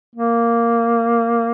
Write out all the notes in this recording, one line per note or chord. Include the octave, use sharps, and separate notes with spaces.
A#3